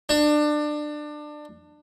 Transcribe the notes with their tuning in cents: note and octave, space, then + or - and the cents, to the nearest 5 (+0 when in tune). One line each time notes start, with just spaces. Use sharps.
D4 +25